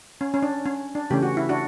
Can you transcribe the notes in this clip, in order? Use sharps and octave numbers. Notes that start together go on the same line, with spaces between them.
C#4
C#4
D4
C#4
D4
C#3 E3 A3 C#4 G4
F#4
E4
D4 F#4